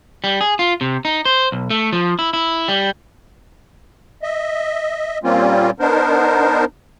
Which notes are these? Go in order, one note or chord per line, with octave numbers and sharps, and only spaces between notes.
G3
G#4
F4
C3
D#4
C5
B1
A3
F3
E4
E4
G3
D#5 E5
A#2 G3 A#3 C4 C#4 F4
B3 D4 D#4 A#4 C5